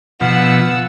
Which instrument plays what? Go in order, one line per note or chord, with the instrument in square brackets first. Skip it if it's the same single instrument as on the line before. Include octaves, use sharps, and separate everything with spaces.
[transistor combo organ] B2 F3 [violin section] F#5 E6